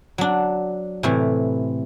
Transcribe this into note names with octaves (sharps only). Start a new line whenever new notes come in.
F#3 D4
A2 C3 E3